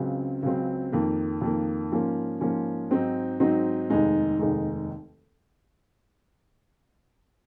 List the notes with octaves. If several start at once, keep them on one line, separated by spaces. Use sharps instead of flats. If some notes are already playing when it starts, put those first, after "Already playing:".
Already playing: C#2 C#3 F#3 C4
C#2 C#3 F#3 C4
F2 D#3 A#3
F2 D#3 A#3
G#2 F3 A#3 C#4
G#2 F3 A#3 C#4
G#2 F#3 C4 D#4
G#2 F#3 C4 D#4
F1 D#2 D#3 G#3 D#4
F1 D#2 D#3 G#3 D#4